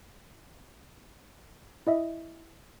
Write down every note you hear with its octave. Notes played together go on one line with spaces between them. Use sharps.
E4 D#5 E5